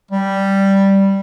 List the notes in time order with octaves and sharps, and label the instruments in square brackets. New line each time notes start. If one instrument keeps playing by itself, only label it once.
[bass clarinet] G3